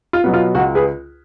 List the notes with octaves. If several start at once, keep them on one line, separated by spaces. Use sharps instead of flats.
F4
B2 F#3 B3
F4
C#2 F#4
G#4 B4